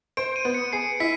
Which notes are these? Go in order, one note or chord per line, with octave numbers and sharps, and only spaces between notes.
C5 D7
D#7
B3
C#7
G#4 C7
E4 B6